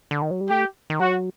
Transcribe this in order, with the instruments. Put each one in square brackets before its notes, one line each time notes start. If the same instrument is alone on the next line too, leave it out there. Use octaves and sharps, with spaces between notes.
[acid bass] D3
D#3
F#3
G3
[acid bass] A3 [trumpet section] G4
[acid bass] D#3
[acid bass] F#3 [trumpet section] F#4